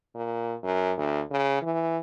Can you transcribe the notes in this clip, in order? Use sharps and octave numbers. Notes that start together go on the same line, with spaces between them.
A#2
F#2
D2
C#3
E3